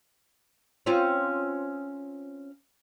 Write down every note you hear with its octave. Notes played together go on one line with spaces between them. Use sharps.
C4 C#4 F4